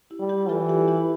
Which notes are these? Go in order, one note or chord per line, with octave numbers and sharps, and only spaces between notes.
E4 G4
G3
E4 G4
E3 F4 A4
E4 G4
E4 G4